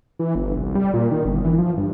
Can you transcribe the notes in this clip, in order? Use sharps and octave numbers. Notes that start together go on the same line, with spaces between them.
E3
G1
C2
G3
A#2
D#3
G1
E3
F3
G2